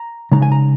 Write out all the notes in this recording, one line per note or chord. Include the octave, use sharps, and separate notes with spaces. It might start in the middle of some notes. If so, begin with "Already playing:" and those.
Already playing: A#5
C#3 G#3 D#4 A#5
G#5
A#5